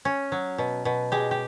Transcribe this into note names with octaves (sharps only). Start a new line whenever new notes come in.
C#4
F#3
B2
B2
G#3 G4
G4